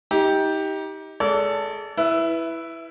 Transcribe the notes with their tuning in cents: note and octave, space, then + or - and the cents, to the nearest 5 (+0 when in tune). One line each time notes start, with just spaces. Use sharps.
D#4 +30 G4 +0
G#3 +20 A4 +15 D5 -40
E4 +0 B4 +0 E5 +40